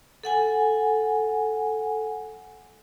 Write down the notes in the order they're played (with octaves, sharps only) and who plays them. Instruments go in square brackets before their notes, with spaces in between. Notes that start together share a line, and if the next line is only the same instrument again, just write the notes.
[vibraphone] A4 F#5 G#5